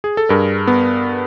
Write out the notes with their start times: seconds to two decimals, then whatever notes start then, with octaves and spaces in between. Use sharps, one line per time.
0.04 G#4
0.17 A4
0.29 G2 G#4 A#4
0.67 B3